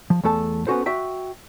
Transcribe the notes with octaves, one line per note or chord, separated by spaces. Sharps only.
F3
E2 A3 A4 A5
B3 C#4 F#4 A4 C5
F#4 E5 G5